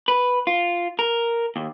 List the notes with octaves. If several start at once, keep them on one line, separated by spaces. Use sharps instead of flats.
B4
F4
A#4
D#2